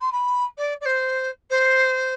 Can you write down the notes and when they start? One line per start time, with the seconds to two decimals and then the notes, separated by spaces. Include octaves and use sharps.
0.01 C6
0.12 B5
0.57 D5
0.81 D5
0.85 C5
1.50 C5